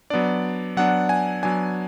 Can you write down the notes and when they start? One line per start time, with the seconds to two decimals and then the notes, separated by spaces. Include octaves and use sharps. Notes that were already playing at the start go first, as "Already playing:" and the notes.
0.10 F#3 B3 D4 D5
0.77 F#3 B3 D4 F#5
1.09 G#5
1.43 F#3 B3 D4 G#5